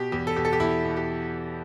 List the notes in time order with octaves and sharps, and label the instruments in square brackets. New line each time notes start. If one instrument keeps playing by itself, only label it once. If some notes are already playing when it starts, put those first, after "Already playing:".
Already playing: [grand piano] B2 G4
E2 G4
A4
B2 G4
A4
G4
E2 E4
B2
G4